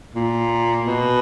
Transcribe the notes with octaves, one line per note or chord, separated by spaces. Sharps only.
A#2
B2